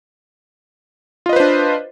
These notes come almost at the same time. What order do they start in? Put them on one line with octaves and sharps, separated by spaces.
F4 D#5 B4 C5 D4